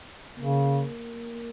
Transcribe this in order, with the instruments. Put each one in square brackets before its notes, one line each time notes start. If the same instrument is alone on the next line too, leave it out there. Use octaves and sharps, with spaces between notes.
[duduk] C#3 [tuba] A#3